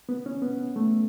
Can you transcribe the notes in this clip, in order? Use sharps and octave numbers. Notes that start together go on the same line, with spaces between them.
B3
C#4
B3
A3